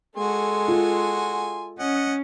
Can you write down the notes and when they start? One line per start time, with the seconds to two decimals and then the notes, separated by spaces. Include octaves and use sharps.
0.17 G#3 F#4 A4 G#5 C6
0.68 F4
1.79 C#4 D#5 F#5